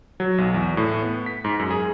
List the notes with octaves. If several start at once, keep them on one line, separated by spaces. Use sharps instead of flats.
F#3
B1
E2
A2
B3
B6
G#2
F#2
G#4